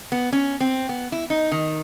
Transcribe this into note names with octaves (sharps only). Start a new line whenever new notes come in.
B3
C#4
C4
B3
E4
D#4
D#3